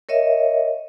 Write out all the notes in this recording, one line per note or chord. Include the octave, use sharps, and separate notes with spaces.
A#4 C#5 D#5 E5